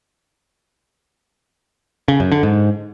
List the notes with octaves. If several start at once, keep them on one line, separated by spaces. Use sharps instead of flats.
C#3
F#2
D3
G#2